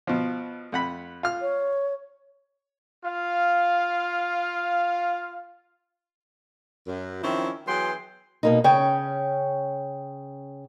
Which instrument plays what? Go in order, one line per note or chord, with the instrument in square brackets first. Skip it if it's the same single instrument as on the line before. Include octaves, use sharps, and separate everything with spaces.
[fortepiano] B2 F3
F2 F#5 B5
F4 F6
[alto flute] C#5
[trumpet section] F4 F5
[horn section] F#2
D#3 F3 C4 C#4 E4
E3 F#3 B3 G#4 G5 C6
[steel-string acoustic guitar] B2 A#3 D#4
C#3 C#4 C#5 G5